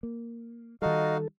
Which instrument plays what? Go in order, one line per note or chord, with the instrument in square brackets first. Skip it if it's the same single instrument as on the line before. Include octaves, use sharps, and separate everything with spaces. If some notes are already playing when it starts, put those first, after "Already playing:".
[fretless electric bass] A#3
[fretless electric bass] D#3 G3 [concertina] D#4 F#4 F5 [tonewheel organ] A4 [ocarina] D#5